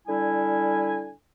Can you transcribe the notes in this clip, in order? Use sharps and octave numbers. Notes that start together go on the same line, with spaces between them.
D3 G3 E4 G#5